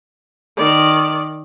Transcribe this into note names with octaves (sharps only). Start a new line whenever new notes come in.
D#3 D5